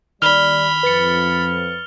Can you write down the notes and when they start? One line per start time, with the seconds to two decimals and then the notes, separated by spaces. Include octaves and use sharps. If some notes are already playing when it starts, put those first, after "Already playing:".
0.22 D#2 D#3 G3 D5 B5 F6 F7 G7
0.83 F2 B4 A6 C#7